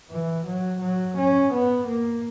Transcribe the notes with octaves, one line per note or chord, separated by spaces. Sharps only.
E3
F#3
F#3
C#4
B3
A#3